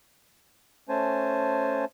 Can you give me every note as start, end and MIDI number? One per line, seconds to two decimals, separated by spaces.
0.89 1.85 57
0.89 1.85 61
0.89 1.85 72
0.89 1.85 80
0.89 1.85 81